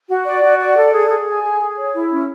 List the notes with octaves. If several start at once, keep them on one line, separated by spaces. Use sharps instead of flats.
F#4
D5
F#4
D5
A4
G#4
G#4
G#5
G#4
G#4
C#5
E4
C#4